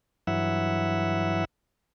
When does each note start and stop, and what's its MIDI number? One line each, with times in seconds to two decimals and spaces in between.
0.27 1.45 43
0.27 1.45 52
0.27 1.45 54
0.27 1.45 64
0.27 1.45 76
0.27 1.45 78